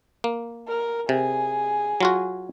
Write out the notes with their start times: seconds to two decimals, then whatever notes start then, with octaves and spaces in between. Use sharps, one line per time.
0.24 A#3
0.68 A#4
1.09 C3 G#4
2.01 F#3 F4 F#4